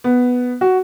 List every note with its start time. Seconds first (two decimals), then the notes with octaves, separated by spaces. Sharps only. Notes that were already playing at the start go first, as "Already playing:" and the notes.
0.04 B3
0.61 F#4